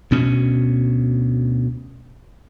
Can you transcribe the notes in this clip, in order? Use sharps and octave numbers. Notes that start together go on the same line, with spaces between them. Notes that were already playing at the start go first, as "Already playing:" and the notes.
D2 B2 C#4